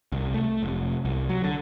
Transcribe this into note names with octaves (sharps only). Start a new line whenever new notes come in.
C2
A3
F1
C2
F#3
D3